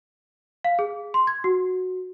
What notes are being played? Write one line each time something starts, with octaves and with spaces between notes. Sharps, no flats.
F5
G#4
C6
G#6
F#4